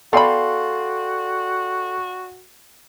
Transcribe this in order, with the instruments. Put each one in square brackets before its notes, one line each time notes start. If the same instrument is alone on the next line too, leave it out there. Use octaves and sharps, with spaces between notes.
[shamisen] B3 B5 [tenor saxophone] F#4 [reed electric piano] A4 C6 [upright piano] D5 F5 G5